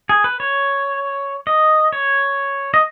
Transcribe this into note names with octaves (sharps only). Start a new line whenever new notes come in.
G#4
B4
C#5
D#5
C#5
D#5